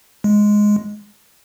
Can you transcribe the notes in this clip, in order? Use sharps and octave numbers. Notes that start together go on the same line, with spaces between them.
G#3